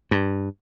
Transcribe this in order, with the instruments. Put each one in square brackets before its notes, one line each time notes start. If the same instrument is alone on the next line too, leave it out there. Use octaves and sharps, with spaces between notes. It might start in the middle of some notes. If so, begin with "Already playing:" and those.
[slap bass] G2